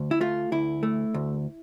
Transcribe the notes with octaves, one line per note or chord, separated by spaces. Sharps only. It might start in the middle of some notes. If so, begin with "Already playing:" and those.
Already playing: D2
E4
A3 F4
D2 E4
A3
D2